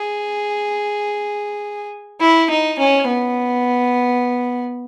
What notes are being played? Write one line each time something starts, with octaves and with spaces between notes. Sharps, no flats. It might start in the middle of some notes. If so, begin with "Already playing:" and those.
Already playing: G#4
E4
D#4
C#4
B3